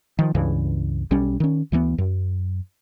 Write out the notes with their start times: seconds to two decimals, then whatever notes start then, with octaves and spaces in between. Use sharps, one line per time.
0.19 D#3 F3
0.35 C#2 G2 C#3 E3
1.11 B1 G3 C#4
1.40 D#3 C#4
1.72 D2 E3 F#3 B3
1.98 F#2